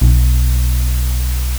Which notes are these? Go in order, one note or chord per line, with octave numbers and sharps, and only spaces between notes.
B1